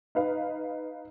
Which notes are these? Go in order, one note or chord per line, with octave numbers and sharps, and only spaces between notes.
D#4 B4 F5